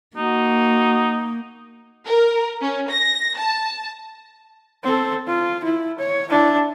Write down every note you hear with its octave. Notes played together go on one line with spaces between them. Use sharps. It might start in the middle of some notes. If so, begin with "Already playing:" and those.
A#3 D#4 F#4
A#4
C#4
A#6
A5
C4 A4
F4
E4
C#5
D4 E4